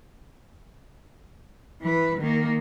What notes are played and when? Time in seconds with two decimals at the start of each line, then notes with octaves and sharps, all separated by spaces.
1.82 E3 B4
2.19 D#3 A#3